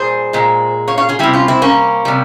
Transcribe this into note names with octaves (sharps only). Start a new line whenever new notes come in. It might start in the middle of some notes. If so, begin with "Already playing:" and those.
Already playing: A#2 G3 G#4 C5
A#2 G#3
C#5 F5
C#5 F5
F4 G#4
C3 G3 E4 G4
C#4 F4
C4 E4
A#3 C#4
C3 G3